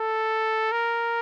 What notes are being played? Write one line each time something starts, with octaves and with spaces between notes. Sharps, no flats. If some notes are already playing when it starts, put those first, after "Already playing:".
Already playing: A4
A#4